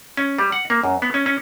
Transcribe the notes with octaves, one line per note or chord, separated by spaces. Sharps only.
C#4
G3
F#5
A#3
F#2
B3
C#4
C#4